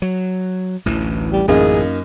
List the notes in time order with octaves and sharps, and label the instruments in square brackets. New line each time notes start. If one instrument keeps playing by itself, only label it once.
[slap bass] F#3
A1 D2 E3
[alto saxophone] G3
[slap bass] A1 [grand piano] F#2 A#3 D#4 [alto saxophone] G#4